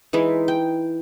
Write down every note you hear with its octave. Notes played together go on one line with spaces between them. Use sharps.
E3 G#3 D#4 E4
G5